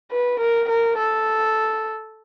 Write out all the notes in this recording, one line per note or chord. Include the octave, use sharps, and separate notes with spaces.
B4
A#4
A#4
A4